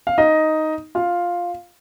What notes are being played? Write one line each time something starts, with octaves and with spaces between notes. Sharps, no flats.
F5
D#4 D#5
F4 F5